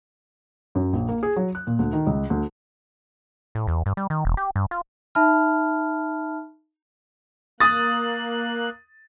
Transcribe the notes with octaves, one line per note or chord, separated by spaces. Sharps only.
F#2
A#1
A#3
G#4
F#3
F#6
A#2
D2
D#3
C#2
D2
A2
E2
G2
G3
D#3
E1
G4
G2
F4
D#4 E5 A5 B5 F6
A#3 D#6 F#6 A6